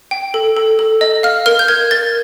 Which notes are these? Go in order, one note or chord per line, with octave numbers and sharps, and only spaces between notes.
G5
A4
A4
A4
D#5
F5 F6
A#4 F6
G6
A#4 G#6
A#4 A6